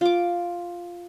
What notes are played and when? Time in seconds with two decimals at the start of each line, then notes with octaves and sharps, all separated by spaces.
0.01 F4 D6